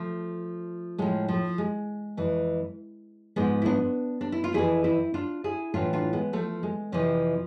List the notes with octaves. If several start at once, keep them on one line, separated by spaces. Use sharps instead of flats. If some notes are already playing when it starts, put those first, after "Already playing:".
Already playing: F3 A3
A2 F3 G#3
F3
G#3
F2 E3
G#2 F3 G#3 B3
E4
B3 D4
D4
E4
F4
F2 E3 E4 G#4
C4 E4
D4 F4
E4 G#4
A2 E3 D4 F4
D4 F4
G#3 B3
F3 A3
G#3
F2 C3 E3 F3